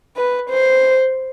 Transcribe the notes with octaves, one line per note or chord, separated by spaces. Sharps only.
B4
C5